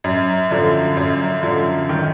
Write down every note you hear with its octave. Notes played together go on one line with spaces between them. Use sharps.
F#2
D3 F3
F#2
D3 F3
D#3